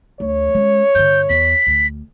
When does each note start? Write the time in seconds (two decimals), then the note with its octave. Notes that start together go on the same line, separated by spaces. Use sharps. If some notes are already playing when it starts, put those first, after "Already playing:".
0.20 D2 C#5
0.55 G#3 C#4
0.95 G2 D3 G6
1.29 E2 B6
1.67 D2